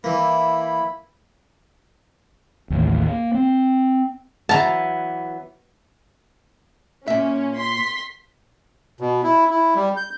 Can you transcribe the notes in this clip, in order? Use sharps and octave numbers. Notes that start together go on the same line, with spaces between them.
E3 A#3 E4 B5
A1 D#2
A#3
C4
E3 F#3 B3 A5 A#5
A#2 C#4 E5
C6 B6
B2
E4
E4
G3
G6